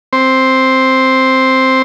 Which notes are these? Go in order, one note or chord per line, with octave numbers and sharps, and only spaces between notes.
C4 C5